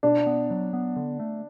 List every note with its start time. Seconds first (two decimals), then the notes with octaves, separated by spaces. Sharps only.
0.03 B2 D4
0.26 B3
0.50 F#3
0.73 B3
0.96 D3
1.20 A3